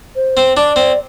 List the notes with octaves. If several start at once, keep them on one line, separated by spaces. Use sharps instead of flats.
C5
C4
D4 D5
C4